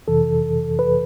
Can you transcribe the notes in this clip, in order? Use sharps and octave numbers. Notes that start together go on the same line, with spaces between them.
F2 C3 E3 A4
B4